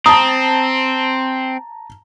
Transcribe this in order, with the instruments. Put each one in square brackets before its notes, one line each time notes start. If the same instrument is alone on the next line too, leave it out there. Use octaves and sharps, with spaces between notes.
[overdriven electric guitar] C4 [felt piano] A5 A#5 [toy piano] D#6